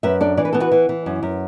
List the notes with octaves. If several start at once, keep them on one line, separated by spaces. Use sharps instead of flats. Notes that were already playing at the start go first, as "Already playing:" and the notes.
F#2 B4 E5
D4 A4 D5
E3 D5
B4
B3 A4
F#4 B4
E3
E3
F#2
F#2